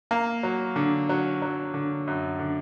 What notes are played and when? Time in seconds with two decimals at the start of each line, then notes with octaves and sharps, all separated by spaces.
0.11 A#3
0.43 F#3
0.76 D3
1.09 F#3
1.42 F#3
1.74 D3
2.07 F#2
2.39 D3